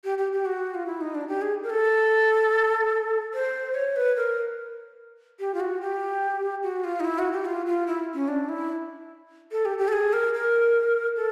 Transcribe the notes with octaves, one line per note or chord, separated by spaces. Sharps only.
G4
G4
G4
F#4
F4
E4
D#4
D4
G4
G#4
A#4
A4
C5
C#5
B4
A#4
G4
F4
F#4
G4
F#4
F4
D#4
E4
F#4
G4
F4
F4
E4
C#4
D4
E4
A4
G4
G4
A4
G#4
A#4
A#4
A4